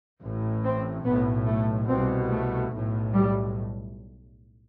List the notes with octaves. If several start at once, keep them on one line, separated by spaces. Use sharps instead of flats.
A1 A2
C4
B1 A2 B3
A3
C2 B2 C4
A3
B1 A2
G3